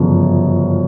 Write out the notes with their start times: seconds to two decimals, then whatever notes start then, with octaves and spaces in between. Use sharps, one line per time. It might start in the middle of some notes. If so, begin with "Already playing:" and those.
Already playing: G1 F#2 C#3 F3